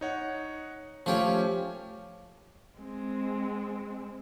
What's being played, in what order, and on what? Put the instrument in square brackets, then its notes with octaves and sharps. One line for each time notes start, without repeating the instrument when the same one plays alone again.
[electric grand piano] D#4 C#5 F#5
[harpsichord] F3 C#5 [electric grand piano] A3 C#4 G4
[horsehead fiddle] G#3 C4